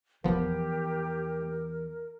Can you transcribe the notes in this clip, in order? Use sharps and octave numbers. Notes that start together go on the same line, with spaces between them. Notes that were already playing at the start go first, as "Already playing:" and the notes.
E2 E3 F3 B3 G4 A#4